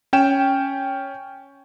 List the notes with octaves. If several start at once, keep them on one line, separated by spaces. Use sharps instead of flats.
C#4 G5 E7